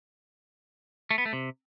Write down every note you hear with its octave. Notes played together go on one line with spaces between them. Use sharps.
A3
B3
A3
C3